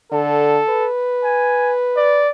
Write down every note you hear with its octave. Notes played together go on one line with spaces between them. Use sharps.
D3 A4
B4
G#5
D5